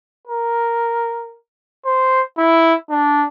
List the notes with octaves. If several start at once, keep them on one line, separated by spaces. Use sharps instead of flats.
A#4
C5
E4
D4